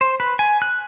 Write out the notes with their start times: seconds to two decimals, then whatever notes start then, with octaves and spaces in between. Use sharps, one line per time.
0.01 C5
0.20 B4
0.39 G#5
0.62 F#6